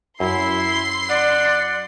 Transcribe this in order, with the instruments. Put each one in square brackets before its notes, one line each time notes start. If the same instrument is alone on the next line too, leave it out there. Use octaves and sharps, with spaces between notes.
[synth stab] F#2 [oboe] E4 [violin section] C6 C7
[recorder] D5 [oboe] F#5